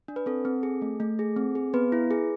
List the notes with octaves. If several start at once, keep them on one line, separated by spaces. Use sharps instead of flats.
D4
B4
C4 A4
C4
G#4
A3
A3
G#4
C4
G#4
B3 B4
E4
G#4